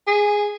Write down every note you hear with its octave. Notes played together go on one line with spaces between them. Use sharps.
G#4